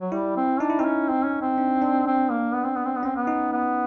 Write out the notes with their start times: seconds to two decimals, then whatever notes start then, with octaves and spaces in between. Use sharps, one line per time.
0.01 F#3
0.12 G3 E4
0.37 C4
0.60 D4 D#4
0.70 E4
0.79 C4 D#4
0.85 C#4
1.09 C4
1.25 C#4
1.42 C4
1.58 D4
1.82 D4
2.06 C4
2.31 A#3
2.54 B3
2.65 C4
2.75 B3
2.85 C4
2.96 B3
3.03 C4 C#4
3.16 B3
3.27 D#4
3.52 B3